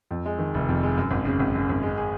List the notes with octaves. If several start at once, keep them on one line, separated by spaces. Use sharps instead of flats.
F2
G#3
D#3
F1
F2
G#3
F#2
G#1
C#3
G#1
F#2
G#1
G#3
G#4